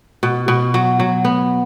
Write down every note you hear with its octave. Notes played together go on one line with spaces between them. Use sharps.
B2
B2
F#3
F#3
B3